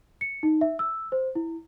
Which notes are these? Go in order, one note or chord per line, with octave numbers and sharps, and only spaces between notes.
C#7
D#4
E5
E6
C5
E4